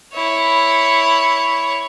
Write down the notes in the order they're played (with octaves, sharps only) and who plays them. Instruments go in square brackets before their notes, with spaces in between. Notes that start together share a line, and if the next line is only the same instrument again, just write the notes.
[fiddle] E4 C#5